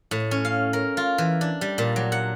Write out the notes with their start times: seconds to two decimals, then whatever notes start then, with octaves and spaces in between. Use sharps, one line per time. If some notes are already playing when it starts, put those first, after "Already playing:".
0.11 A2
0.31 C#4
0.45 F5
0.73 A#4
0.97 F4
1.18 E3
1.41 D4
1.61 G3
1.78 A#2
1.96 F#3
2.12 F#5